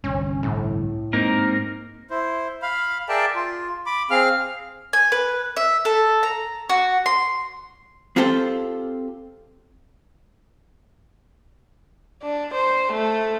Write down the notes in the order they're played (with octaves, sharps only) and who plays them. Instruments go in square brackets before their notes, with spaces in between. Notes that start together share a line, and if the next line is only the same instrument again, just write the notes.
[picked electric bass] G1 C2 G2 [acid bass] C#4
[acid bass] A2
[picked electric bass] G#2 [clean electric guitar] A#3 C4 D#4 [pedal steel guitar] A#4
[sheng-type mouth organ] E4 C5
F5 B5
G#4 A#4 D5 E5 G5 A5
F4
B5 D6
C4 G#4 F5 F6
[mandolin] G#5
B4
E5
A4
A#5
F#4
C6
[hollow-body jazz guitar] C4 F4 G4 A4 C5
[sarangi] D4
C5
A3